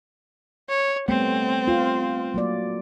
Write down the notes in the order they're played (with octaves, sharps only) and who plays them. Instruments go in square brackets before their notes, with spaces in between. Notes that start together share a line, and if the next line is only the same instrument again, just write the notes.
[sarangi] C#5
[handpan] G3 A3 B3 [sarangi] C4
[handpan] F4
F#3 A#3 D5